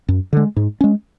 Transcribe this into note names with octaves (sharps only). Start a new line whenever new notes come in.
F#2
D3 G#3
G#2
G#3 C#4